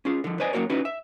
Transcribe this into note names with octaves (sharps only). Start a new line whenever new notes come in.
C#4 F4 G#4
D3 F3
B4 C5 D5 D#5 G#5
F#2 A3 A#3 F#4 A#4 C#5
C#4 D#4 E4 F#4 B4
E5